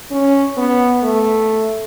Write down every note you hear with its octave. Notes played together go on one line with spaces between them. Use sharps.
C#4
B3
A3